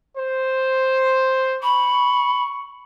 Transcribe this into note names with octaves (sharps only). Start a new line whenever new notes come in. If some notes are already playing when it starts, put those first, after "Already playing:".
C5
B5 C#6